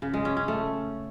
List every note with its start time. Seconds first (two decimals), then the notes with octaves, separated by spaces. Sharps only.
0.02 C#3
0.14 G#3
0.25 C#4
0.37 C#4
0.48 A3